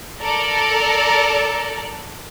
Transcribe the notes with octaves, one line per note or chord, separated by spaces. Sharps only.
A4 A#4 D5